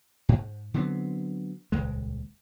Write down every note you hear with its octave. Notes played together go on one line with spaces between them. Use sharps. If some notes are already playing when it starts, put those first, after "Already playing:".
G#2
D3 F#3 B3 C4
D#1 C#2 G#3